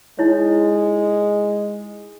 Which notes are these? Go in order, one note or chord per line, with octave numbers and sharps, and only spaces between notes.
G#3 D#4 E4 C#5